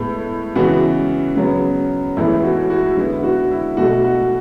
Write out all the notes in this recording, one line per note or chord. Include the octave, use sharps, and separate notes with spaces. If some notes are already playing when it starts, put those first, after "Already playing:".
Already playing: A2 G#3 B3
C#3 E3 G#3 B3 F#4
C#3 F#3 B3
A2 E3 G#3 B3 E4
F#4
F#4
D3 G#3 B3 E4
F#4
E4
B2 A3 F#4
F#4